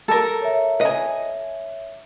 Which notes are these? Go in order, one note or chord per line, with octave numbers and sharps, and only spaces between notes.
A4 A#4
C#5 E5
D#5 G#5